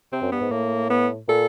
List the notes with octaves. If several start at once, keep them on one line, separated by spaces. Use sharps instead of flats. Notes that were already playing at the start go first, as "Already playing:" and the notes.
C3 C4
F#2
G2 B3
G#2
A2 A#3
B3
A#2 A4